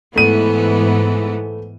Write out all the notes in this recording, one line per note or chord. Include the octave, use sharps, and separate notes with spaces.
G#2 E3 A3 B3 D#7